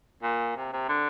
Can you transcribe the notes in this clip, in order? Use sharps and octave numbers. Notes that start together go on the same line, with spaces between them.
A#2
C3
C3
D3